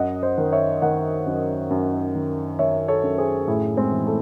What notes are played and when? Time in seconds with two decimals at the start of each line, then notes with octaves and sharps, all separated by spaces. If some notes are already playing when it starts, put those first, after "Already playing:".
Already playing: F#2 D#5 F#5
0.23 C5 D#5
0.38 D#3
0.52 C#5 E5
0.82 D#3 D#5 F#5
1.26 F#2
1.70 F#2
2.15 D#3
2.59 D#3 C#5 E5
2.88 A4 C#5
3.03 F#2
3.18 G#4 C5
3.47 A2 E4 G#4
3.77 G#3 C4
3.91 E3
4.07 A3